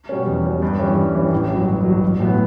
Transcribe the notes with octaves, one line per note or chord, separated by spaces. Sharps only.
B2 G3 C#4
E2
B2 G3 C#4
G2
E3 G3 C#4
G2
E3 G3 C#4
A1
G2 F#3
A1
G2 F#3
A1
A2 F#3 B3